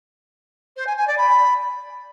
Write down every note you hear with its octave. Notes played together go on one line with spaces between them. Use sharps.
C5
G#5
G#5
D5
B5